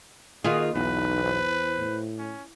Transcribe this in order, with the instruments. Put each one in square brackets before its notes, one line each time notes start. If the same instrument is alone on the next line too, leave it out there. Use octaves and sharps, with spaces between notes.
[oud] D#3 F4 G#4 [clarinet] A#3 [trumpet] F#4
[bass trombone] B1 [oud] E2 [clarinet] D#4 [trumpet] B4
[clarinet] C5
[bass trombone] A2
[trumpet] C#4